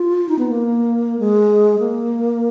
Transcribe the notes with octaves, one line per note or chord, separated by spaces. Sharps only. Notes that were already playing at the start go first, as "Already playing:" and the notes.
Already playing: F4
D#4
B3
A#3
G#3
A#3